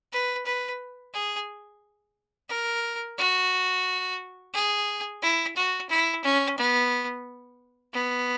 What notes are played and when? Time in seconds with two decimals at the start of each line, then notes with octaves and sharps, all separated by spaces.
0.12 B4
0.46 B4
1.13 G#4
2.50 A#4
3.18 F#4
4.54 G#4
5.22 E4
5.56 F#4
5.90 E4
6.24 C#4
6.58 B3
7.93 B3